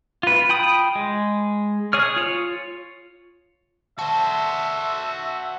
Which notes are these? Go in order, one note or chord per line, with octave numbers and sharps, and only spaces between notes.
F4 B4
F4 G5 B5 D#6
G#3
G#4 C#5 F6
F4 C#5
F#4 C5 E5 A5